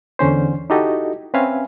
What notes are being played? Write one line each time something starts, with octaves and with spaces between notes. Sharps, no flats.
E2 D3 C#4 C5
D#4 E4 F#4 G4 A4 D#5
C4 C#4 B4 E5 F5 G#5